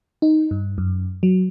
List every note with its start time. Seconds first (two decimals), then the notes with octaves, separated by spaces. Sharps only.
0.22 D#4
0.51 G2
0.78 F#2
1.23 F#3